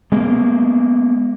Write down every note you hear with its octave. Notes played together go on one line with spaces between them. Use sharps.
G#3 A#3 B3